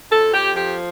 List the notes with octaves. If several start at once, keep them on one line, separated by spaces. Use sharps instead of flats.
F2 A4
G4
F3 G4